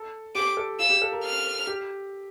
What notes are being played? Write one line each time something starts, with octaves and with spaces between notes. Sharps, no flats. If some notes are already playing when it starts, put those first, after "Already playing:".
Already playing: A4
G4 D6
A4
F4 E6
G4
A4
A#4
F6
G4